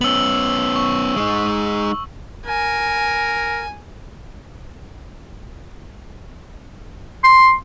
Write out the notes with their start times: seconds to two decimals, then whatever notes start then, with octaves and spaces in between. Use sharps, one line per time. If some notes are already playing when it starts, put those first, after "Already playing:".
0.01 B3 C#4 E6 F#7
0.76 C#6
1.16 G#3 D#4
2.46 A#4 G#5
7.24 C6